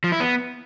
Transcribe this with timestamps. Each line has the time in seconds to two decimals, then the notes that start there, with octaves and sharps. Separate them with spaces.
0.04 F3
0.12 E4
0.20 B3